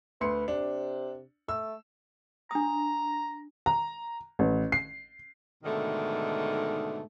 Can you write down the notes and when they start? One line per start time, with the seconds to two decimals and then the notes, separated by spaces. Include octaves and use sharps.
0.21 D2 B4 C6 C#7
0.48 C3 D4
1.49 A3 E6
2.51 D4 A#5 D#6
3.66 A#5
4.39 A1
4.72 C7
5.64 G#2 B2 D3 D#3 A3